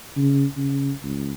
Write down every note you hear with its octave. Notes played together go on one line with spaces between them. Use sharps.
C#3
C#3
C#2